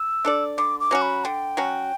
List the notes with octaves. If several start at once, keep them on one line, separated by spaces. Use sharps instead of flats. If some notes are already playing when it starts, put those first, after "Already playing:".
Already playing: E6
D4 A4 D5
D3 D6
D6
F#3 C#4 F#4
B5
D3 G5
F#3 C#4 F#4